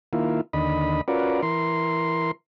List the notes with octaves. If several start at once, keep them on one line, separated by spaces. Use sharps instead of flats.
D#3 A#3 E4 F4
D#2 D3 D#5 B5
C#4 F4 F#4 A#4 B4 D5
E3 A#4 C6